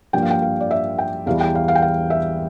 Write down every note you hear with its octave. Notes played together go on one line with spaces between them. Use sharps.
G2 F3 A#3 G5
F5
G5
F5
D5
E5
G5
E2 E3 G3 F5
G5
F5
F5
G5
F5
E5